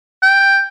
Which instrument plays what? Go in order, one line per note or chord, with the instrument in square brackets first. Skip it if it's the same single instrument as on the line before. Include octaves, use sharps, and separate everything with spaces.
[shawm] G5